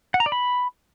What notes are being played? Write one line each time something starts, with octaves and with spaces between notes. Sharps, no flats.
F#5
A#5
D5
B5